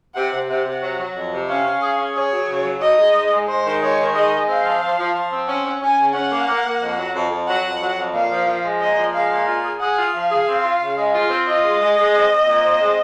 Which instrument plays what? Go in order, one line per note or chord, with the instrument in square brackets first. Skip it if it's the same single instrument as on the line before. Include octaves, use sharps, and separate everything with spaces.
[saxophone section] C3 [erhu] F#5
[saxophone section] C3
[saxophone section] C3 [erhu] F#5
[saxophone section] C3
F#3
F#3
F2
C3
[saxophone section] C#4 [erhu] F5
[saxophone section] C#4
G#4
C#4
[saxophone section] G#4 [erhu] C#5
[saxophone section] F#3
C#3
F#3
[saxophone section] D#4 [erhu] D#5
[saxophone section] G#3
G#2
G#3
[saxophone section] G#3 [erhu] C5
[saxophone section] D#3
[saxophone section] G#3 [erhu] C#5
[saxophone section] D#3
[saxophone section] G#3 [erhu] D#5
[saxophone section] G#3
[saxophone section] C4 [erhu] F5
[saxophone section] F3
F3
F3
F3
C4
[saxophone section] C#4 [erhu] F#5
[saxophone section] C#4
[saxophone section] C#4 [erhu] G#5
[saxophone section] C#3
[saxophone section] C#4 [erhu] F#5
[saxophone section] A#3
A#3
A#3
F2
F#3
F2
F2
[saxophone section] F#3 [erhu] F#5
[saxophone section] F2
F#3
F2
[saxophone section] A#2 [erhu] F5
[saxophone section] F3
F3
G#3
[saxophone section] A#2 [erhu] D#5
[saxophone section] F3
[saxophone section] G#3 [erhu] F5
[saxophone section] A#2
F4
G#4
[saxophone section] G#4 [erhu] F#5
[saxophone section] F4
[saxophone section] F3 [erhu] F5
[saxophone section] G#4
C4
F4
C#3
G#3
F4
C4
[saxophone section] F4 [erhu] D#5
[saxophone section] G#3
G#3
G#3
C4
C4
A#2
C4
G#3